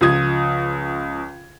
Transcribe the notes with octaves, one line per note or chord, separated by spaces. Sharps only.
C#2 F3 D#6 G#6